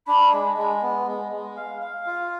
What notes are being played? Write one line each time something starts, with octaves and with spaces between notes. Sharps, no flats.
D4 B5
G#3
G#3
B3
G#3
G#3
F5
F5
F4